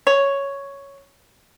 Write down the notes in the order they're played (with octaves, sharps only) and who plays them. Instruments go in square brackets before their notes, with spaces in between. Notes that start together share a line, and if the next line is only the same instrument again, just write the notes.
[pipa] C#5